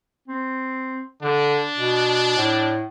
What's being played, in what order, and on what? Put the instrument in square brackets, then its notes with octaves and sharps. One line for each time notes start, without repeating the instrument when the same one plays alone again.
[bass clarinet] C4
[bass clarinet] D3 [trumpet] D4
[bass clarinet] B2
A2